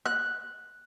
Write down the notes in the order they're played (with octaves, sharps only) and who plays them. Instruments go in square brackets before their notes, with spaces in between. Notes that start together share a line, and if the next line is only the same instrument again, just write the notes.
[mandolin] F#6